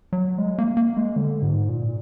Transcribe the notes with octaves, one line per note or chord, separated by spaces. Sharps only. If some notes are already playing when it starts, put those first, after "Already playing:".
F#3
G#3
A#3
A#3
G#3
D3
G#2
A#2